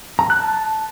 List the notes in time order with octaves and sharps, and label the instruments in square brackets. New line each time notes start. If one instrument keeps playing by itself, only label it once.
[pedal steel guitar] A#5
F#6
A5